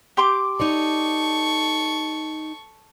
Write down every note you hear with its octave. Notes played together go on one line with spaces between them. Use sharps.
G4 C6 D6
D#4 A4 C#5 D5 C#6